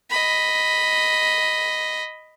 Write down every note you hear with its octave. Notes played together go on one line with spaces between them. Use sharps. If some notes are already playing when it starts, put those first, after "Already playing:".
D#5 B5